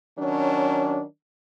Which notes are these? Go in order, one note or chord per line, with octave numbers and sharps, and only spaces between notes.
D#3 F#3 C#4 D4